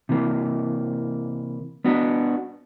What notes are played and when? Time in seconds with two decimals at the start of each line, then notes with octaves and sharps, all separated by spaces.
0.09 C3 E3 A#3
1.85 B3 D4 F#4